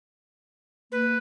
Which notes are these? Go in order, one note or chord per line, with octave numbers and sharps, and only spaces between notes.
A#3 B4